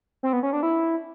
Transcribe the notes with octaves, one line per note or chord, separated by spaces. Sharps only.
C4
B3
C#4
D4
E4